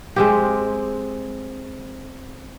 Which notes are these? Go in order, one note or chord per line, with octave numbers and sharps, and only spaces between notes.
G#3 C4 G4